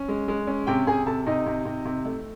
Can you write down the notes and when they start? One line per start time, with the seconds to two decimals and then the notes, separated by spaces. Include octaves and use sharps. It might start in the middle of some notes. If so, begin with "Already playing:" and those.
Already playing: C#4
0.08 G#3
0.28 G#3
0.47 C#4
0.67 C3 G4 G5
0.87 C3 G#4 G#5
1.06 C3 A4 A5
1.26 C3 D#4 D#5
1.46 C3
1.65 C3
1.85 C3
2.05 A3